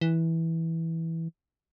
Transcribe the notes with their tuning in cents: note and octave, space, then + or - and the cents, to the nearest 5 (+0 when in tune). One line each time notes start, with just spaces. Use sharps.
E3 -10